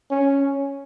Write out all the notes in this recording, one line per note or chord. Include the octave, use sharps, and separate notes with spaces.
C#4